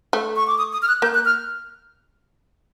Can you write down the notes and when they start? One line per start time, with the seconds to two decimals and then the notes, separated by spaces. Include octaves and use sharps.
0.13 A3
0.36 C#6
0.47 D6
0.58 D#6
0.73 D#6
0.82 F6
0.88 F#6
1.02 A#3 G6
1.15 F#6
1.25 F6